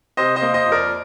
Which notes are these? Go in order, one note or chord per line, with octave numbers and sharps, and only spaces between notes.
C3 C5 D#5
C5 D#5
A#3
C5 D#5
F2
A#4 D5